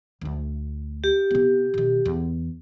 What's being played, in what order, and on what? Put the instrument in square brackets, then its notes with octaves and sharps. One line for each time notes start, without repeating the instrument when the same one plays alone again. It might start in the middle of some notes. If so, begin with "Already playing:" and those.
[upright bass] D2 A3
[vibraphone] G4
[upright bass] C3 B3
B2 D#3
E2